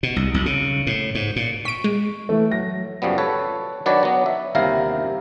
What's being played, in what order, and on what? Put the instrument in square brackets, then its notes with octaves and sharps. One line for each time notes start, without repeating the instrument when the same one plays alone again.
[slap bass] B2
C2
B1
C#3
A2
G#2
A#2
[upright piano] C#6 [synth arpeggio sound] B6 D7
[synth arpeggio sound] G#3
[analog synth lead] E3 [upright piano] A3
[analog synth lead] F#3 [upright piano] A#6
[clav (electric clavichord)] C#2 F#2 F3 G3 B3
A4 B4 C#5
D#3 F#3 D4 B4 C#5 D5
F#3 B3
E5
G1 D#2 C3 E4 A#4 F5